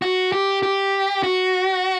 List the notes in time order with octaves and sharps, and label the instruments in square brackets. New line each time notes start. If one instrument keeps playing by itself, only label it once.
[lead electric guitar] F#4
G4
G4
F#4